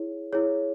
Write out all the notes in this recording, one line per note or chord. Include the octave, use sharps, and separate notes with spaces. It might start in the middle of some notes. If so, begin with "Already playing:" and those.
Already playing: E4 G#4 C#5
E4 G#4 C#5